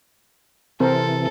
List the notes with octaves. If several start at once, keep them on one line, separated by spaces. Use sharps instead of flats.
C3 E3 C4 A4 A#4 C5